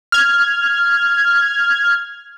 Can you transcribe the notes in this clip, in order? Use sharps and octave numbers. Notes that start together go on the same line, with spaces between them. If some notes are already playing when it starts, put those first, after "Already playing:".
F6 G#6